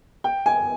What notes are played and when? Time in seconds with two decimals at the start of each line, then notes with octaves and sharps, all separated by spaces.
0.24 G5
0.46 G#5